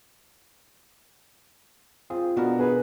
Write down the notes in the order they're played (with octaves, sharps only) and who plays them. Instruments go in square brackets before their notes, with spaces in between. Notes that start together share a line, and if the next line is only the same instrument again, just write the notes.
[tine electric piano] C4 G#4 [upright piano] F4
[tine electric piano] B2 A#4 [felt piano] B3 D4 F#4
[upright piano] G#4 [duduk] B4